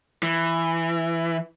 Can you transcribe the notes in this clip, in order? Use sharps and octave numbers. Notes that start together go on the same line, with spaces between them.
E3